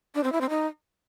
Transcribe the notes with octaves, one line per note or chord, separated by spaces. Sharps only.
D4
C4
E4
C4
D#4